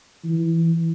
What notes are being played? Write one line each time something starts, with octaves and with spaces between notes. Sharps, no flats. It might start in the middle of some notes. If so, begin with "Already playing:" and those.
E3